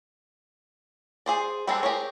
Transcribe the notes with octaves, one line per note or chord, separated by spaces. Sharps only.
G#4 C5 D5
G3 G#3 C4 D4 A4
G4 G#4 A#4 C#5